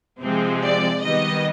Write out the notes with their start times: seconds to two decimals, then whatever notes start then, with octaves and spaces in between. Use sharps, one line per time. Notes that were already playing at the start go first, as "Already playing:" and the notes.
0.21 C3 F3 G#3 C4
0.62 D5
1.01 D#3 G3 B3 D#5